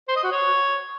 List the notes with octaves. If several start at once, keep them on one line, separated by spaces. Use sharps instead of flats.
C5
D#5
F#4
C#5